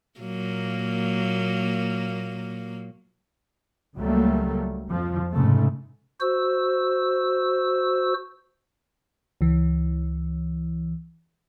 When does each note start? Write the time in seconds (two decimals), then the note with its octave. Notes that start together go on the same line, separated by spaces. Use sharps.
0.20 A#2 F#3 A#3
3.97 C#2 F#3 G3 A3 A#3
4.88 F2 F3
5.32 F1 G#2 C#3 A3
6.21 F#4 C5 E6
9.41 C#2 E3